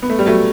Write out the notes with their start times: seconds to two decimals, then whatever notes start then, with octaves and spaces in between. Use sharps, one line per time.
0.02 B3
0.10 A3
0.19 G3
0.26 F#3 A3